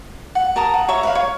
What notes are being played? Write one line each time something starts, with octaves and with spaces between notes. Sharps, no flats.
F#5
A#4 A5 A#5 D#6
F#5
C#5 E5 A#5
B4 E5 F5
C#5